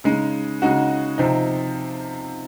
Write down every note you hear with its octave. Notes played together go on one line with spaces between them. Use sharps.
C#3 G#3 D#4
C#3 G#3 D#4 F#4
C3 F3 C4 D#4